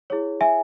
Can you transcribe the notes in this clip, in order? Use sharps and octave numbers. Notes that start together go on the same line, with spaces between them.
E4 G#4 C#5
E5 G#5